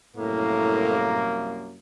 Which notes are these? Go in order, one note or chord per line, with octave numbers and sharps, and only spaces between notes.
C2 F#2 A2 A#3